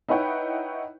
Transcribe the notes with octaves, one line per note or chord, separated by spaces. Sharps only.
D#4 E4 B4 C#5 F#5 G5